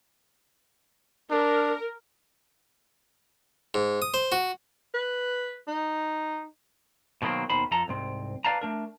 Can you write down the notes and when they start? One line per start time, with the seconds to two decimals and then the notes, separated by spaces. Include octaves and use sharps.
1.31 D4 A#4
3.74 G#2
4.02 D#6
4.14 C5
4.32 F#4
4.94 B4
5.68 D#4
7.22 B2 D#3 F#3 A#3 C4
7.50 D#2 B2 D#3 C5 B5
7.71 F2 F3 A4 A#5
7.88 C2 G#2 C4
8.44 B4 D5 F5 A5 A#5
8.61 A3 D4 A#4